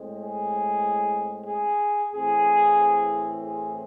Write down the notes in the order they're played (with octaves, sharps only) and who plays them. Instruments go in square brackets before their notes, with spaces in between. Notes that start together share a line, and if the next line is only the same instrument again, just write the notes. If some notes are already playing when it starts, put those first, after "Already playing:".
Already playing: [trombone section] A2 G#3 C4
G#4
G#4
A2 E3 C4 G#4
G#4